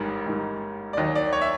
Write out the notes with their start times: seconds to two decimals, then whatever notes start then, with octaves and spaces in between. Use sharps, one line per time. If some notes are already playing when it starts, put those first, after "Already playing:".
Already playing: A1 G#2 D#3 G3 A#4
0.27 A1 G#2 D#3 G3
0.93 D5
0.97 D#2 D#3 F#3 D#5
1.15 D5
1.33 C#5
1.42 E5